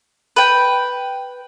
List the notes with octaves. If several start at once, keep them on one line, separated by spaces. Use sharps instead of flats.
B4 G5